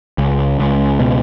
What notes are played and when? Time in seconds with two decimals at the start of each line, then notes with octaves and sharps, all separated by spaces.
0.18 C#2
0.59 C#2
1.00 B2